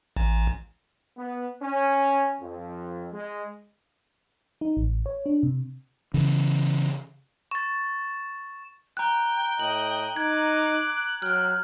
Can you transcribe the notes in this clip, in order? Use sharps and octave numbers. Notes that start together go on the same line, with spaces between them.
A1
B3
C#4
F2
G#3
D#4
A1
C#5
D4
C3
C#3 E3
C#6 A6
G5 A#5 F#6
A2 D#5 F#7
D#4 D6 F#6 G#6
F#3 G5 F6